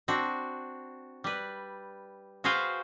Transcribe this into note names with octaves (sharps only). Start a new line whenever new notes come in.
C4 D4 F#4
G3 B4
F#4 G#4 B4 C5 F5 G5